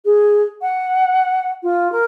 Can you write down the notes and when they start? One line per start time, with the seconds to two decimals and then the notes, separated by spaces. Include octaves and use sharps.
0.05 G#4
0.61 F#5
1.63 F4
1.92 A#4